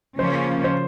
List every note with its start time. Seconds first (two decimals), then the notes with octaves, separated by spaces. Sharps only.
0.18 C#3 F3 A#3 C#4 F4 C5
0.64 C5